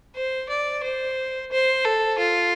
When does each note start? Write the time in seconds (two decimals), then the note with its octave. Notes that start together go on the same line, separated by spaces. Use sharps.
0.15 C5
0.49 D5
0.83 C5
1.52 C5
1.85 A4
2.19 F4